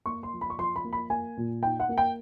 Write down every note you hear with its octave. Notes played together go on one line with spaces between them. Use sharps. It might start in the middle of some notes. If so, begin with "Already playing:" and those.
A#3 C#6
C6
F3
B5
C#6
F3 C6
B5
A#3
B5
A#3 G#5
A#2
D#4 G5
F#5
A#3
G5